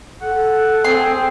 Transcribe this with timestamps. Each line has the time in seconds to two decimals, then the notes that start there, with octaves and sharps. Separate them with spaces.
0.22 A4 F#5
0.84 C4 G#4 C6